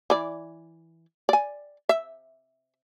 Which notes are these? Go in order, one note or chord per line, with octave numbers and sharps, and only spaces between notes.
E3 D5
D5 G#5
E5